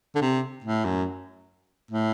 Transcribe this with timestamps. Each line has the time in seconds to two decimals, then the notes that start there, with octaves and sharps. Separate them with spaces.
0.15 D3
0.21 C3
0.64 A2
0.85 F#2
1.91 A2